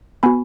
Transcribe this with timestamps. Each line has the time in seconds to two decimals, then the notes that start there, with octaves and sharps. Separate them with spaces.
0.23 B3 F#4 G#5 B5